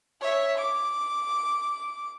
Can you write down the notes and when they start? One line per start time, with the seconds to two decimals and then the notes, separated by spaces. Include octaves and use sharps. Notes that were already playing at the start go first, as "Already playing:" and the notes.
0.21 C#5 E5
0.57 D6